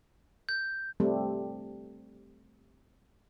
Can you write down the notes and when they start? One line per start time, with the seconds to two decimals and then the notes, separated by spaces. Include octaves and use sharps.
0.49 G6
1.00 G3 A3 C4